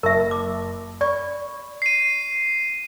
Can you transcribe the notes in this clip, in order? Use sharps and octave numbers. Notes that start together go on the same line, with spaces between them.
F#1 A#4 E5 A5 C#6
D6
D5 B5 C#6
C7 D#7